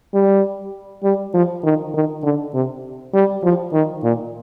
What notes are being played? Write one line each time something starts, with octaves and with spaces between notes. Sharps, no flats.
G3
G3
F3
D#3
D#3
D3
C3
G3
F3
D#3
A#2